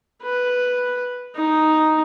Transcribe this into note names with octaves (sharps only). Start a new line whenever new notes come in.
B4
D#4